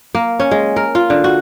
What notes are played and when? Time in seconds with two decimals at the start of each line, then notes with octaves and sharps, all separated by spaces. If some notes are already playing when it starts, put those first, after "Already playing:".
0.15 A#3
0.40 C#4
0.51 G#3
0.76 A#4
0.95 F4
1.10 D3
1.24 F#4